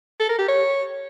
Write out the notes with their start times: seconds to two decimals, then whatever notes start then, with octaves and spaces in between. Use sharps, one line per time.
0.20 A4
0.29 A#4
0.39 G4
0.48 C#5